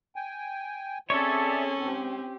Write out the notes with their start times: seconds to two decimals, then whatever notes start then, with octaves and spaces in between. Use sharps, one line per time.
0.16 G5 G#5
1.10 C4 C#4 G#4 A4 C#5 D5 E5
1.78 G#2 C4 G4